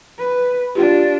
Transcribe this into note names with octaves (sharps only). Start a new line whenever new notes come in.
B4
D4 F4 G4